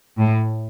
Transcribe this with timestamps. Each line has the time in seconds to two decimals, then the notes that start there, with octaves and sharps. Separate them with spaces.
0.19 A2